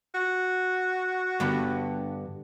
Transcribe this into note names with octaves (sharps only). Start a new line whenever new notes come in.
F#4
G2 D3 B3